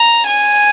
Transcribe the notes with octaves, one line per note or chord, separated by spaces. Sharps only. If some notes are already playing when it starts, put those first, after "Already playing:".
Already playing: A#5
G#5